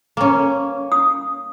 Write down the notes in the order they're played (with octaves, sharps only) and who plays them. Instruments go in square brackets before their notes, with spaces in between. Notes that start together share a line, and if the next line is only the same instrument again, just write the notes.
[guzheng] A#3 C#4
[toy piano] D#6